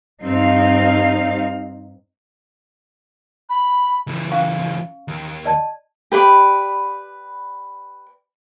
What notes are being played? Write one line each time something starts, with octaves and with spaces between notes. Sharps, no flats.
G2 C4 D#4 F5
B5
C#2 E3
C#4 F5 C#6
D#2
D5 D#5 A5
G4 B4 D5 B5